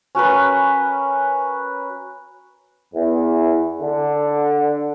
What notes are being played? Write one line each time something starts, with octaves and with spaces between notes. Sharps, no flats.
C#4 F#4 A#4 B4
E2
D3